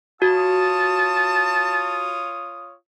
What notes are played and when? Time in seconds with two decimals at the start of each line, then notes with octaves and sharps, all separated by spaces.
0.22 F4 F#4 C#5 A5 D#6